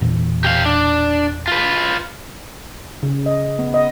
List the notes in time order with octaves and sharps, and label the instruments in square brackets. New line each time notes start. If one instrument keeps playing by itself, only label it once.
[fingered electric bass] E1 A#2 E3
[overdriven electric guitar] G4 F5
D4
F4 B4
[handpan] C#3
D#5
B3
D#5